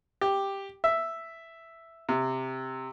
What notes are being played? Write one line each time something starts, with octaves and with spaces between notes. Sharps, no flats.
G4
E5
C3